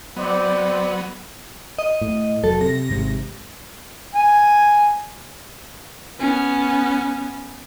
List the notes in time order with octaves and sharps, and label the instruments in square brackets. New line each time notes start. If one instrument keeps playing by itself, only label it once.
[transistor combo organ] F#3 B3 [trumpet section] C4 C5 D5
[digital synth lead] D#5
[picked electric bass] A2
[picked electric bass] F1 F#3 [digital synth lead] A4
[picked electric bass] C3 [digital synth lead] A#6
[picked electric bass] G#1 G#2 C3
[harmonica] G#5
[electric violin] B3 C#4